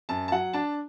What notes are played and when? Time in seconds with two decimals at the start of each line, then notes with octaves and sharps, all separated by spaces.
0.09 F#2 A5
0.28 A5
0.31 F#3 F#5
0.53 D4 A5